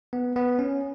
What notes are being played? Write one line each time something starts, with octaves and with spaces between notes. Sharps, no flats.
B3
B3
C#4